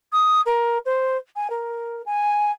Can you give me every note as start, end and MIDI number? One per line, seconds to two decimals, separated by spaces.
0.12 0.41 87
0.46 0.78 70
0.86 1.17 72
1.36 1.48 80
1.50 2.02 70
2.06 2.51 80